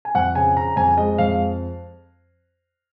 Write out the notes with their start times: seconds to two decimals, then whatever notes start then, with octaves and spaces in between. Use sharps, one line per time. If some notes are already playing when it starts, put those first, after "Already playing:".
0.05 G#5
0.15 F2 F#5
0.35 C#3 G#5
0.56 C#3 A#5
0.76 F2 G#5
0.97 G#3 D#5
1.18 F2 F5